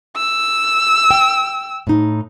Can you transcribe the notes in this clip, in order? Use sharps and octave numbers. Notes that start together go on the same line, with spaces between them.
E6
G5
A2 D#4